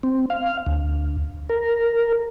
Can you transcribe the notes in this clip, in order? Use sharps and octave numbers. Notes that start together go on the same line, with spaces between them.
C4
F5
D2
A#4